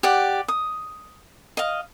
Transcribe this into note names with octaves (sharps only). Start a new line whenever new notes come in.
G4 D5 F#5
D#6
D#5 F5